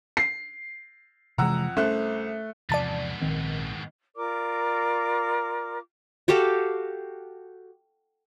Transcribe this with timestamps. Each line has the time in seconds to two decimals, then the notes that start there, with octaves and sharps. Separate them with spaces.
0.17 C7
1.38 F2 C3 E3 G#3 F#5 A#5 E6
1.77 C2 A3 C#4 C5 F#6
2.70 E2 G#2 C3 F3 B3 D5 A5 A6
3.21 A#1 D#3 C4
4.16 F4 A#4 D5 D6
6.28 F#4 G4 A4 F5